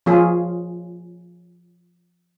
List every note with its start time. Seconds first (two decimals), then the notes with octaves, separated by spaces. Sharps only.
0.06 F3 C#4 F4 G#4